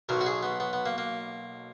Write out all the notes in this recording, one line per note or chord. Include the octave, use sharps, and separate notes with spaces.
B1 B2 F#3 A#4
F#4
G#4
B3
B3
B3
A#3
A#3